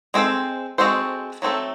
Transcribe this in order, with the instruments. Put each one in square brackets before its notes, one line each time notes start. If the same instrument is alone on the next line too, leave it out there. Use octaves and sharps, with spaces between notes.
[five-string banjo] G#3 C4 F#4 A4 C5
G#3 C4 F#4 A4 C5
F#3 A3 C4 F#4 A4